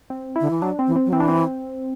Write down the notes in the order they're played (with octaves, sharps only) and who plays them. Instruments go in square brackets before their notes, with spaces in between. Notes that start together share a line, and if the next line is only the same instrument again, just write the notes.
[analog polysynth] C4
E4
[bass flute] D3
E3
[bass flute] F#3 [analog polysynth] D4
[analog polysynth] C4
[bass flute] E3
[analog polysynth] C4
[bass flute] F#3
[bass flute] E3 [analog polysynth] C4
[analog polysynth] D4
C4